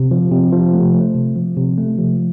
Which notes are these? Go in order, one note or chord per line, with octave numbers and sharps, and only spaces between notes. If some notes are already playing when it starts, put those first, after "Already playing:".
Already playing: C3
F3
C3
F3
A3
A3
C3
F3
C3
A3
F3